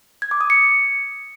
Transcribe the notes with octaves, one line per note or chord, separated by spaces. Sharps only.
G#6
D6
D#6
C#7